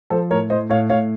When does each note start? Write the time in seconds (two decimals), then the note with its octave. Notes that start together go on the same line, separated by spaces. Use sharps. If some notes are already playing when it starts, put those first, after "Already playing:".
0.10 F3 A4 C5
0.31 A2 A#4 C#5
0.50 A2 C5 D#5
0.69 A2 C#5 F5
0.90 A2 C#5 F5